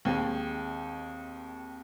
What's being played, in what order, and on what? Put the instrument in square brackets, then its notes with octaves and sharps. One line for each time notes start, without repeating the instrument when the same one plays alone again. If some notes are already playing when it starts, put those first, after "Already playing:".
[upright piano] D#2 D#3 G#3 [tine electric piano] C4